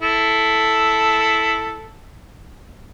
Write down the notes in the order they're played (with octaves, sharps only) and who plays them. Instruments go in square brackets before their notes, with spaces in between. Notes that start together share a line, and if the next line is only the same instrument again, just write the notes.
[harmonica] E4 A4